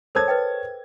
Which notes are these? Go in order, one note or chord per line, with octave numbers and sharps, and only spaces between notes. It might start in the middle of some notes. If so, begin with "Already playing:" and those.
A4 A#4 C5 C#5 A5 G#6
B4 D#5 G5